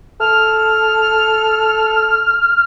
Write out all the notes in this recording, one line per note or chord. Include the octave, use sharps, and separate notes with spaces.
A4 F6